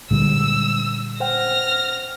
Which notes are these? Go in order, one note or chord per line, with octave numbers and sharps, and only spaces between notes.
A#2 D3 G3 G#3 E6
C5 F#5 G5 F6 A#6